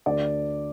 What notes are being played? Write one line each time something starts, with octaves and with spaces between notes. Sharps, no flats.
D2 D5